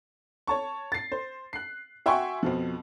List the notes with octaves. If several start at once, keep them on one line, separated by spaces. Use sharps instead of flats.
C#5 A5 C#6
A6 C7
C5
F#6 C7
F#4 E5 G5 G#5 C6 C#6
F2 B2 F3